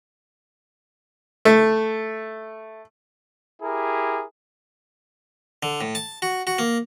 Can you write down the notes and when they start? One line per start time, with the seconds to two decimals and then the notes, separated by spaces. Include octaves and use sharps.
1.45 A3
3.62 E4 G4 G#4 A#4
5.63 D3
5.81 A2
5.95 A5
6.22 F#4
6.47 F#4
6.59 A#3